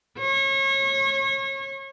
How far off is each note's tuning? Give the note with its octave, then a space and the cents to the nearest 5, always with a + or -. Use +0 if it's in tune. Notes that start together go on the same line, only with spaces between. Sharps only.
C#5 -30